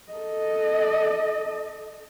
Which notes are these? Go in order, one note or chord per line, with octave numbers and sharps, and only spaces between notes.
A4 D#5